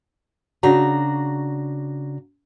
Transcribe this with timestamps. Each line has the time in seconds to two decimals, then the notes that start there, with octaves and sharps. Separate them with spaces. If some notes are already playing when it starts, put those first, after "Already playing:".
0.63 C#3 D4 F#4 A#5